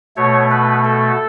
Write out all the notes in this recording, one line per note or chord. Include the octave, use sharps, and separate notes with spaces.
B2 A3 C#5
B4
A4